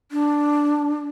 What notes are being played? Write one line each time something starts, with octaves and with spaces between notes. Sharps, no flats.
D4